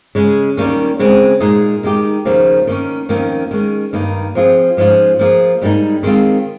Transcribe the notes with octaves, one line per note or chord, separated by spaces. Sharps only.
C#3 G#3 C#4
D#2 D#3 G3 A#3 C#4
C#3 G#3 C4
A#2 G#3 D#4 G#4
D#3 G#3 D#4 G4
D#2 C#3 F3 A#3
D#3 A#3 C#4
F2 D#3 A#3 C#4 F4
D#3 G#3 C#4
G2 D#3 A#3 D#4
F3 C4 F4 G#4
G#2 F3 G#3 C#4 F4
F3 A#3 F4 G#4
G#2 G3 A#3 D#4
D#3 G#3 C4 F4